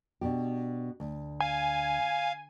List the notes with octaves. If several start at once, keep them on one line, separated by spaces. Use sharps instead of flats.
B2 D4 G4
D2
F5 G#5